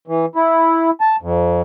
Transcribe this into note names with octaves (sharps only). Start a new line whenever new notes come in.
E3
E4
A5
F2